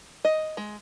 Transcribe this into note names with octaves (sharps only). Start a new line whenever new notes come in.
D#5
G#3